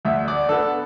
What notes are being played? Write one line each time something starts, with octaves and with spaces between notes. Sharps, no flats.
D2 E5
D5
D3 B3 A4